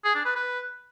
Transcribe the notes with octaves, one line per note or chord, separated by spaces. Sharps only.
G#4
D4
B4
B4